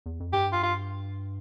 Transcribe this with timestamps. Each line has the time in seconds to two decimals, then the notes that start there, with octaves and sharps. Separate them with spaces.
0.06 E2
0.20 F2
0.33 G2 G4
0.53 F4
0.63 F4